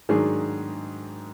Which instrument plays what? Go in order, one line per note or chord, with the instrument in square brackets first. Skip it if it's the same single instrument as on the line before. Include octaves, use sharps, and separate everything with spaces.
[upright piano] G#2 D#3 F#3 D4 G#4